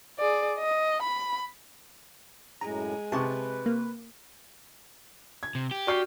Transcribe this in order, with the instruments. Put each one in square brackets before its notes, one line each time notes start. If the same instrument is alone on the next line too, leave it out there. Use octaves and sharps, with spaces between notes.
[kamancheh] G#4 D5
D#5
B5
[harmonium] F#2 A2 [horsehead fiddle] G#3 [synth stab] A#5
[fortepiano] C3 C#6 [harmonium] B4 [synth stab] A5
[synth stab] A#3
[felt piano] G#6
[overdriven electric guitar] C3
G4
[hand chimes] F#4 F6 G6 [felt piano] D5 C#6 C7